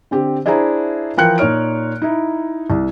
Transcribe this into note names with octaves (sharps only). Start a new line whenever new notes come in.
D3 C4 G4
D4 E4 G#4 C5 E5 A#5
E3 F3 A#4 G5 F#6 C#7
A#2 D#4 C#5 F6 D7
D#4 E4
C2